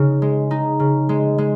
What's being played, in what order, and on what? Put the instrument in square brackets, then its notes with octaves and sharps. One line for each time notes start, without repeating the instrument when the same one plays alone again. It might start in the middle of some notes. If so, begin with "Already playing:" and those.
Already playing: [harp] C#3 D#4
G#3
D#4
C#3
G#3
G#3